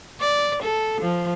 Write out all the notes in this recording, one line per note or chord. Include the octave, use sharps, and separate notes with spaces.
D5
A4
F3